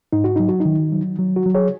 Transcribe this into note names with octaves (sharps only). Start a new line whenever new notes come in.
G#2 D#4
F#4
F#3 D#4
F#4
D#4
D#3
F#3
F#3
F#4
F#3
G#4 C#5